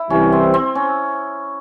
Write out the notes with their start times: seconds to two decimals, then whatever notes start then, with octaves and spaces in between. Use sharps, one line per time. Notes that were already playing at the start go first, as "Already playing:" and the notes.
Already playing: E4
0.10 C2 C3 E3 G3 C#4
0.32 C4
0.54 C4
0.75 C#4